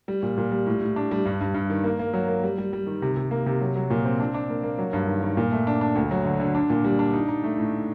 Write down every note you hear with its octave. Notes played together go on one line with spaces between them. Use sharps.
G3
A#2
A#2
G3
A2
A2
D4
G3
G2
G2
G2
D#3
A#3
A#3
F#3
A#3
G3
G3
G3
D#3
C3
C3
A#3
C3
F#3
F#3
A#2
C4
D4
D4
A#3
A#3
F#3
G2
D#3
D#3
A#2
A3
D4
D4
D2
F#3
D3
D3
D4
A#2
G3
D4
D#4
D#4
A3
A2